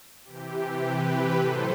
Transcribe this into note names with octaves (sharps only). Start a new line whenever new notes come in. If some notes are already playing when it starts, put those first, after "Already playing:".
C3 E3 G4
G4 B4
A2 F#3 A4 C5